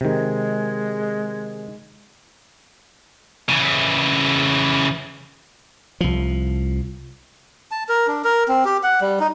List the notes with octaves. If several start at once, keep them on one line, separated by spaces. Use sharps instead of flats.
C3 D#3 G#3
C#3 E3
C2 F3
A5
A#4
D4
A#4
C4
G4
F#5
G3
D#4